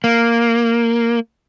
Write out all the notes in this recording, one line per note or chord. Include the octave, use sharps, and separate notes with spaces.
A#3